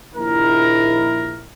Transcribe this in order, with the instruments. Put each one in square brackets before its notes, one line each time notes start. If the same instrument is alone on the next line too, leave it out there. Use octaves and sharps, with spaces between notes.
[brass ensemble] A#1 D#3 E4 A#4